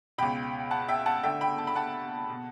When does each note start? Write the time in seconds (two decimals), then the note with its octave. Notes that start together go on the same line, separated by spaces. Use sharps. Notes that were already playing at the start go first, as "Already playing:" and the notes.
0.18 C#2 B2 G5 B5
0.71 F#5 A5
0.88 E5 G5
1.06 F#5 A5
1.23 D2 D3 E5 G5
1.41 G5 B5
1.58 A5
1.67 B5
1.75 F#5 A5
2.29 B2